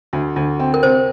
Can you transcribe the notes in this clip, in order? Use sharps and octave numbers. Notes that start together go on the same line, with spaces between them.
D2
D2
C4
A#4
C3 C5